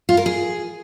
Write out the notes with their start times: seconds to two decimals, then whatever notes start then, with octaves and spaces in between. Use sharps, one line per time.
0.09 F4
0.17 A#4
0.26 G#4